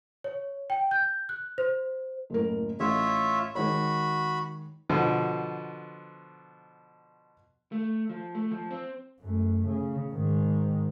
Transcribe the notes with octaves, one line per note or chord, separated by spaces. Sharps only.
C#5
G5
G6
F#6
C5
F#1 A2 A#4
A1 F4 C#5 E5
D#3 G#3 F#4 C#5 B5
B2 D3 F3
A3
F3
A3
F3
C4
F#2 A3
C#3
G#2 D#3